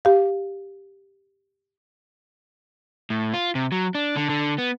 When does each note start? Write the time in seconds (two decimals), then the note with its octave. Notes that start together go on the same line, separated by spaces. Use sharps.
0.05 G4 F5
3.10 A2
3.34 F4
3.55 C3
3.72 F#3
3.95 D4
4.16 D3
4.30 D3
4.58 B3